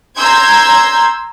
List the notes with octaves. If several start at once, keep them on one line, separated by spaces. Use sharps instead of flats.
A#5 C6 E6 G6 G#6